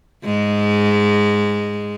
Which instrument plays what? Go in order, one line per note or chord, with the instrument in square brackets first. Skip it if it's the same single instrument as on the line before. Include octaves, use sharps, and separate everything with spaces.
[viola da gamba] G#2 G#3